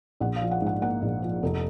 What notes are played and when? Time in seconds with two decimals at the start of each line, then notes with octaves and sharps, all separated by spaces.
0.20 A#1 F#5
0.36 F5
0.42 F3
0.51 F#5
0.62 G#2 F#5
0.82 A#3 F#5
1.02 A#1
1.22 F3
1.43 F1